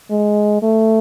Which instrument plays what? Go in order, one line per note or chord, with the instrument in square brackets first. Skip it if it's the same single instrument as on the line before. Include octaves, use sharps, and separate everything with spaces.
[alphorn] G#3
A3